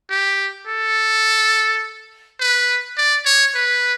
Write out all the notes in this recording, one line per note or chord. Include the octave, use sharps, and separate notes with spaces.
G4
A4
B4
D5
C#5
B4